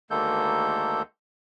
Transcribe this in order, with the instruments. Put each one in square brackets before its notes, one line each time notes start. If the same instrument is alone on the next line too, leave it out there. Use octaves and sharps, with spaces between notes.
[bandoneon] D2 D#3 G#3 A#3 A4 G6